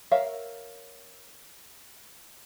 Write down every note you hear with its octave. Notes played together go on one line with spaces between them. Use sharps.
A#4 C#5 E5 F5